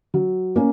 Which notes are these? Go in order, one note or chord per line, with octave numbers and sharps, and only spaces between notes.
F#3
A#3 C#4